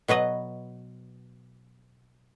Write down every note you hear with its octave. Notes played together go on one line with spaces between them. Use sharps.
B2 F#3 B4 D#5